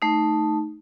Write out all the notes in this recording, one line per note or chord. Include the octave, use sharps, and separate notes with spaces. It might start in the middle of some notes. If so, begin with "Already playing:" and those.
A3 D#4